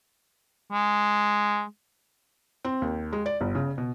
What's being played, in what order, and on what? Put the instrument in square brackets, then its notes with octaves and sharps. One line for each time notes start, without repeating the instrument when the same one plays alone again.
[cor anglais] G#3
[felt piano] C4
D#2
G#3
D5
G1
C#3
B2